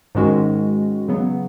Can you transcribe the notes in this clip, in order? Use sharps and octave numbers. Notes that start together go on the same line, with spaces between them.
G#2 D#3 G#3 C#4 F#4
C#3 F#3 B3